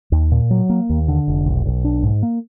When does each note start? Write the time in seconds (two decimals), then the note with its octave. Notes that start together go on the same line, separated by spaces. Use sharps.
0.12 D#2
0.32 A#2
0.51 F#3
0.70 A#3
0.89 D#2
1.08 D3
1.28 F1
1.46 B1
1.66 B1
1.84 D4
2.03 G#2
2.23 A#3